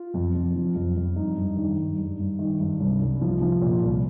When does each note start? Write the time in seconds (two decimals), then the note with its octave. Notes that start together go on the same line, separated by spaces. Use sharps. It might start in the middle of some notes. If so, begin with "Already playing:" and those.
Already playing: F4
0.14 F2
0.35 F2
0.55 F3
0.76 F2
0.96 F2
1.16 G2 D#4
1.37 G2
1.57 D#3
1.78 G2
1.98 G2
2.19 G2
2.39 D#3
2.60 G2
2.80 C2
3.01 C2
3.21 F3
3.42 F3
3.62 A#2
3.83 C2